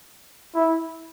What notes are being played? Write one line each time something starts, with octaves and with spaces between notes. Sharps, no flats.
E4